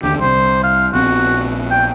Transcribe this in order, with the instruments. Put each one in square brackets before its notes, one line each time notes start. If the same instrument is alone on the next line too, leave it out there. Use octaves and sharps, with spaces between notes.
[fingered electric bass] D#2 D3 [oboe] G4
[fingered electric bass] C2 C3 [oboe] C5
[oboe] F5
[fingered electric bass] A#1 B3 C4 [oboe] F#4
[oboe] G5